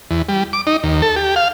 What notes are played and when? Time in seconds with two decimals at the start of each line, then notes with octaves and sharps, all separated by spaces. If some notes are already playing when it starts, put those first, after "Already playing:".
0.11 E2
0.29 G3
0.53 D6
0.67 D#4
0.83 D#2
1.02 A4
1.16 G4
1.36 F5